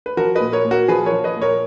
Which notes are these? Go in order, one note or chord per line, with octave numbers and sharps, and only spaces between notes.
B4
F3 F#4 A#4
A#2 B4 D#5
A#4 C#5
A#2
F#4 A#4
F3 G#4 B4
A#4 C#5
F3
B4 D#5
A#2
A#4 C#5